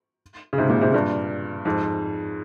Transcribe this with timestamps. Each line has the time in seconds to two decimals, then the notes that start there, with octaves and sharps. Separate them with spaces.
0.53 C#3
0.58 G#2 C3
0.70 A#2 C#3
0.81 G#2 C3
0.93 G2 A#2
1.65 F2 G#2